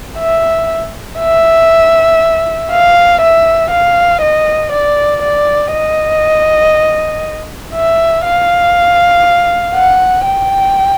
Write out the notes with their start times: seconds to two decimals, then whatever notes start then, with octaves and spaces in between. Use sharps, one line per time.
0.19 E5
1.20 E5
2.71 F5
3.21 E5
3.71 F5
4.21 D#5
4.72 D5
5.22 D5
5.72 D#5
7.74 E5
8.24 F5
9.75 F#5
10.25 G5